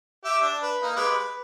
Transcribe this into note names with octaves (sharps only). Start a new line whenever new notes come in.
G4 E5
D4
B4
A#3 D#4
G#3 G4 B4
B4